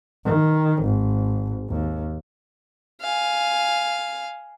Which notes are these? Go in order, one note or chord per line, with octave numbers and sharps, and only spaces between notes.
D#3
G#1
D#2
F5 G#5